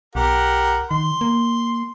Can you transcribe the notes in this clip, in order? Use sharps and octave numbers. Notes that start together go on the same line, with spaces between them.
B1 G4 A#4 F#5
D#3 C6
A#3